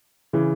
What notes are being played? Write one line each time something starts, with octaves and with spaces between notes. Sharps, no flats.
C#3 E3